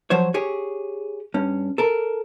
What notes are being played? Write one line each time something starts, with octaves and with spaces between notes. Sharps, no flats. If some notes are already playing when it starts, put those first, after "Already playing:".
F3 F#3 C5 C#5
G4 G#4 C#5
G2 C#4
A4 A#4